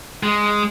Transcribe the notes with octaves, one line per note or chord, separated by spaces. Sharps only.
G#3